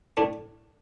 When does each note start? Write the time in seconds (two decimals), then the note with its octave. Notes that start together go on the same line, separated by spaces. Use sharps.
0.17 A2 A3 D4